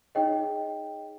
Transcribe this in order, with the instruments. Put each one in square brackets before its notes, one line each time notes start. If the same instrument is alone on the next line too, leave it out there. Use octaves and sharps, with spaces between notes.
[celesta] D#4 G#4 C#5 D#5 G5